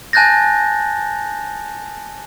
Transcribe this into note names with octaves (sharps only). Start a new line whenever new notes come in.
G#5 A5 F#6 G6 A6 A#6